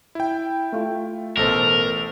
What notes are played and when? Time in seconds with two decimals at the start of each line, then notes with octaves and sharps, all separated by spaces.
0.15 E4 G5
0.72 A3 F4
1.37 A1 B2 A4 A#4 C5 A#6